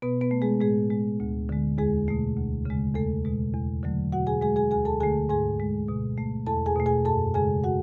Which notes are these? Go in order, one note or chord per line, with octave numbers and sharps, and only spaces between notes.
B2 B3 B4
B3 B4
A3
G#3 G#4
A2 G#3 G#4
G#3
D2
D3 G#3
E2 G#3 G#4
B2 A3
D2
C#3 G#3
E2 A3 A4
B2 G#3
E2
D3 F#3 A3
B2 F#4 F#5
G#4 G#5
G#3 G#4 G#5
G#4 G#5
D2 G#4 G#5
A4 A5
D3 A3 G#4 G#5
G#2 G#4 G#5
G#3
B2
A3
E2 A4 A5
G#4 G#5
B2 A3
G#4 G#5
F#2 A4 A5
C#3 G#3 G#4 G#5
F#4 F#5